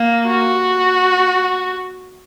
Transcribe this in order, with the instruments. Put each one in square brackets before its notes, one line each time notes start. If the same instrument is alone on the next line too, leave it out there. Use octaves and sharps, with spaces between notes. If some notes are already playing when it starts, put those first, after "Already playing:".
Already playing: [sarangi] A#3
[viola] F#4